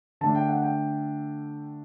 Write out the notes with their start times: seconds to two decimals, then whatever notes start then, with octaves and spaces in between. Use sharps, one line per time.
0.21 D3 A3 D4 A5
0.35 G5
0.48 F#5
0.62 G5